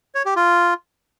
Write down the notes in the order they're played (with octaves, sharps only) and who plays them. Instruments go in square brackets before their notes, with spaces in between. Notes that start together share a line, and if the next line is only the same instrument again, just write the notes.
[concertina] C#5
G4
F4